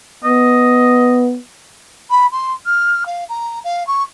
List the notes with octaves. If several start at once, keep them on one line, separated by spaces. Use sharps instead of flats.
B3 D#5
B5
C6
F6
F5
A#5
F5
C#6